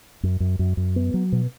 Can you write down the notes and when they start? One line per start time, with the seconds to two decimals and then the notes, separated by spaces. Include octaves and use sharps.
0.23 F#2
0.40 F#2
0.59 F#2
0.77 F#2
0.96 B3
1.14 F#3
1.32 B2